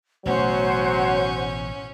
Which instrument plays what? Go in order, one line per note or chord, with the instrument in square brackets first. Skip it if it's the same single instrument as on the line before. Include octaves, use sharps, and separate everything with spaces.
[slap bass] A1 B2 A3 [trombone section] F#3 [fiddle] C#4 [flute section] C5 F#5